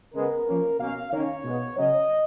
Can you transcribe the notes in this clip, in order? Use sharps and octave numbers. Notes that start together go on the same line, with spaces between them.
C#3 G#3 B3 A#4
F3 A#3 C#4
B2 A#3 C#4 F5
D#3 A#3 C#4 C#5
B2 G#3 B3
C#3 F#3 C#4 D#5